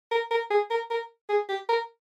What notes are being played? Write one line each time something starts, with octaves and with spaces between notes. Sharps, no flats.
A#4
A#4
G#4
A#4
A#4
G#4
G4
A#4